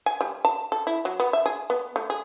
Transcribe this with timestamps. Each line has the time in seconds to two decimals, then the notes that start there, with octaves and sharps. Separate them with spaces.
0.06 G#5
0.21 G3
0.45 A5
0.72 A4
0.87 E4
1.05 F#3
1.20 B3
1.33 E5
1.46 G#4
1.70 B3
1.96 A3
2.10 G#4